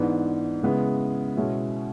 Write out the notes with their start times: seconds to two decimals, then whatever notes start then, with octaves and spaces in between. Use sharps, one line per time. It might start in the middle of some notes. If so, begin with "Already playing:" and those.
Already playing: G#2 E3 B3 D4
0.63 C#3 G#3 B3 E4
1.37 B2 G#3 C#4 E4